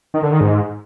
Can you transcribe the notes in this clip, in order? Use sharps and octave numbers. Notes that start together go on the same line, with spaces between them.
D#3
D3
D#3
G#2